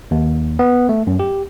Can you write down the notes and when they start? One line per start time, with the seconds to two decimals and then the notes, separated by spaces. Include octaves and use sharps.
0.11 D#2
0.59 B3
0.89 A3
1.07 F#2
1.19 G4